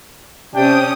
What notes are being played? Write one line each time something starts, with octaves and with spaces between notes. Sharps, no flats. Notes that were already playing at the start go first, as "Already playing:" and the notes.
C3 C#4 D4 G5 D#6